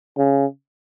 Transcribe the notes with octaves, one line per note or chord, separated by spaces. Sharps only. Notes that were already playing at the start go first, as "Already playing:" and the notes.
C#3